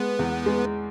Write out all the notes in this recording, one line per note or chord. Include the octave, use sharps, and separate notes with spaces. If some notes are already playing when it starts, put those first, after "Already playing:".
Already playing: G#3 B3
E2
G#3